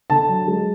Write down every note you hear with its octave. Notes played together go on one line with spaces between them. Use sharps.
D3 A5
F#3
G#3